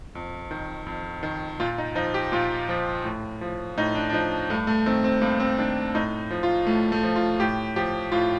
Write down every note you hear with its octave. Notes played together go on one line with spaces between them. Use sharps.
F2
D#3
F2
D#3
A#2 F4
D#4
F3 D#4
G4
A#2 F4
F3
A2
F3
A2 D#4
D4
D4
F3 D#4
G2 A3
A3
D#3 C4
C4
G2 A#3
C4
D#3 D4
A2 D#4
F3
F4
A2 A3
A3
F3
F4
A2 G4
F3 G4
A2 F4